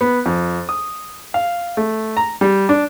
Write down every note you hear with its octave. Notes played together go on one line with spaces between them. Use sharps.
B3
F2
D#6
F5
A3
A#5
G3
D4